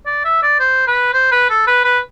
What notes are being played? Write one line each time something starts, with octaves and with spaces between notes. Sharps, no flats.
D5
E5
D5
C5
B4
C5
B4
A4
B4
B4